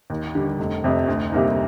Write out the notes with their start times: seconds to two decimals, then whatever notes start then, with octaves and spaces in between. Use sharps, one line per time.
0.10 D#2
0.35 D3 G3
0.59 F1
0.84 F2 C3
1.07 D2
1.32 C3 G3 A#3 D#4